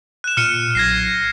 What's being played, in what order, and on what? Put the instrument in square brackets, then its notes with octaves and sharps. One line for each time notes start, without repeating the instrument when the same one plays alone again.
[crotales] F#6 E7
[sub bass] A#2 [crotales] F6 C#7 D#7
[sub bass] B1 [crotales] G#6 A#6 C7